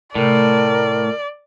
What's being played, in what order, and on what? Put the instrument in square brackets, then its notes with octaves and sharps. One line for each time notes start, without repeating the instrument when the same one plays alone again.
[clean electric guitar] A2 [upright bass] C3 A3 [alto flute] A#4 [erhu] D5